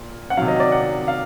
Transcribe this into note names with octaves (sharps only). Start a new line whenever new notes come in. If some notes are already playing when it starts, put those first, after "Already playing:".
Already playing: A#2
F#5
C3 D#3 F#3 F5
D#5
D5
F#5
F5